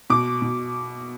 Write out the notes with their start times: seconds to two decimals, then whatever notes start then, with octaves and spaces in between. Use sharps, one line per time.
0.10 B2 D6
0.42 B2